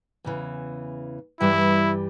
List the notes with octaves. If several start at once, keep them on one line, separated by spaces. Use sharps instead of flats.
E2 C#3 E3
G2 E3 G3 E4